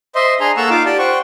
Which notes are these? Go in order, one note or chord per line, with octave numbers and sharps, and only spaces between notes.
C5 D#5 E5 C6
D4 G#4 G#5 A#5 C6
A#3 A4 F#5 A#5 C#6 E6
D#4 F4 F5 D6
G4 D5 G5 A5
C5 F#5 G5 C#6